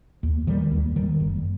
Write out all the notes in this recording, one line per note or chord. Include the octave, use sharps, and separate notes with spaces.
D#2
D#3 G3
D#2
D#3 G3
F#1